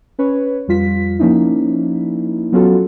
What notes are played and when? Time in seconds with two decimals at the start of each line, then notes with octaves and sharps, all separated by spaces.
0.19 C#4 B4 C#5
0.68 F2 G3 F4 B6
1.19 F3 A#3 C#4 D#4 E4
2.52 F#3 B3 C#4 F4 F#4 A4